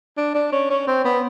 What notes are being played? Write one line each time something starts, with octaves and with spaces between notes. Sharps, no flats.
D4
D4
C#4
C#4
C4
B3